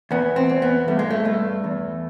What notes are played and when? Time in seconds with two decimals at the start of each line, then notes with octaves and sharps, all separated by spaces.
0.11 E2 B3
0.36 C4
0.50 E2
0.62 B3
0.88 G2 A3
0.99 G#3
1.11 A3
1.25 G2 A3
1.64 E2